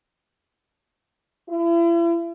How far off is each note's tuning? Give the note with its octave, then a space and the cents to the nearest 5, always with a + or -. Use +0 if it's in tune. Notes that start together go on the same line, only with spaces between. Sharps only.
E4 +40